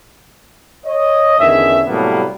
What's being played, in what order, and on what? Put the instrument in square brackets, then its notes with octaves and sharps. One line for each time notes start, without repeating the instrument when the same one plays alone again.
[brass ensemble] C#5 D#5
E2 D3 D#3 C#4 G#4 E5
A2 C3 F#3 G3 A#3 B3